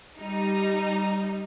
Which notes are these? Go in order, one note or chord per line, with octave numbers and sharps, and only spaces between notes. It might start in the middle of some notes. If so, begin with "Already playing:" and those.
G3 D#4